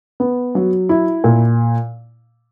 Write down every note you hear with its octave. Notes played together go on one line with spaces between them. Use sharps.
B3
F#3
E4
A#2